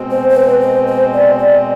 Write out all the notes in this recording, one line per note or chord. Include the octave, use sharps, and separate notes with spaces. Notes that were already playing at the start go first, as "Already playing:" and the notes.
Already playing: B2 G#3 C4
C5
C5
B4
C5
C5
D5
D5